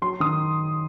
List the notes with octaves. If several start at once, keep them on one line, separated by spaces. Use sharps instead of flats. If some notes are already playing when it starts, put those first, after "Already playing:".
F#3 C6
D#3 D#6